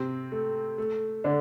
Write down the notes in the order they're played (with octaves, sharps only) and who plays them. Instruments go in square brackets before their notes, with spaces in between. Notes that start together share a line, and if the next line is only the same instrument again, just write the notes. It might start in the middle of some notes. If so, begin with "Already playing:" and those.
Already playing: [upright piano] C3 C4
A3
A3
D3 D4